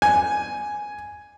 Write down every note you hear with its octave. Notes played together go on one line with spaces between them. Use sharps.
G#5